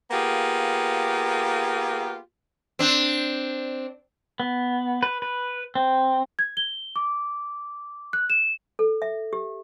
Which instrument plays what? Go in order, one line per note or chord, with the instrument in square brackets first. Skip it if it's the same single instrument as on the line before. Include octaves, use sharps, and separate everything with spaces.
[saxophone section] A#3 B3 F4 G4 G#4
[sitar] C4 D4
[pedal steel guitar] B3
B4
B4
C4
[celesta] G#6
G7
D6
F#6
E7
[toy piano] A4
E5
G4